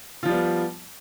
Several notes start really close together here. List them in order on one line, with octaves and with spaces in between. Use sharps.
F4 F3 G3 B3